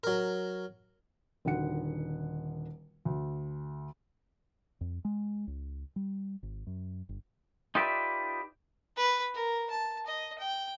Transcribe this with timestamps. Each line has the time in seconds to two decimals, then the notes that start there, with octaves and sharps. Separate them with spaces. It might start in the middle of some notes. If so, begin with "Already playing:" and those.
0.04 F#3 A#4
1.45 D#1 D3 D#3 F#4 F#5 C#7
3.05 D2
4.81 F2
5.05 G#3
5.47 C#2
5.96 G3
6.43 G#1
6.67 F#2
7.09 G1
7.75 D#4 F4 G4 B4 D5 E5
8.96 B4
9.34 A#4
9.70 A5
10.06 D#5
10.38 G5